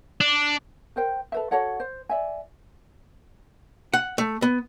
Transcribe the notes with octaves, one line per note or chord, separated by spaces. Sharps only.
D4
A#4 C5 G5
A4 B4 E5
F#4 A4 C#5 F#5
C5
D5 E5 G#5
F#5
A3
B3